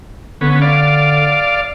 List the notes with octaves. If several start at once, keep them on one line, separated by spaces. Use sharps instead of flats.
D3 B3 C#4
D5 F5